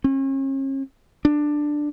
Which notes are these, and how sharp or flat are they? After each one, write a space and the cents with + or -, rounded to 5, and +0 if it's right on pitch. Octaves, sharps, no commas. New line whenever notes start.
C#4 -40
D4 +10